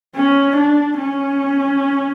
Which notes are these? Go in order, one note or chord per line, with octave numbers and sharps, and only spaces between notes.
C#4
D4
C#4